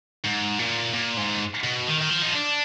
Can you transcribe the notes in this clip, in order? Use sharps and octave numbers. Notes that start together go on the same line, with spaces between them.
G#2
A#2
A#2
G#2
B2
D#3
D#3
F3
D#4
D4